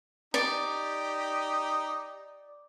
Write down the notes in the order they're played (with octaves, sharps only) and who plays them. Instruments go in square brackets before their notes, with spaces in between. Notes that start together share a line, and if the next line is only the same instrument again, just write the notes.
[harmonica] D#4 G4 [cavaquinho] D5